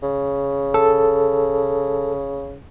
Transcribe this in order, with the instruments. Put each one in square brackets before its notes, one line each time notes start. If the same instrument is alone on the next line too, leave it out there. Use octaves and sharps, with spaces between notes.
[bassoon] C#3
[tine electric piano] A4